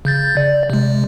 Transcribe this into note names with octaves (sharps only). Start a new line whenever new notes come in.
C#3 G6 A6
D5
C3 G#3